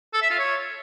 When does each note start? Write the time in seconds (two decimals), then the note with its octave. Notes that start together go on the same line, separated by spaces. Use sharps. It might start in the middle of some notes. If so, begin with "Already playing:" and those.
0.14 A4
0.22 E5
0.30 F4
0.39 C#5